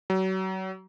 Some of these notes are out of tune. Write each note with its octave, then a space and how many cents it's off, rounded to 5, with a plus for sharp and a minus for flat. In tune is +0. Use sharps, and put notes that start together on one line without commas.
F#3 +35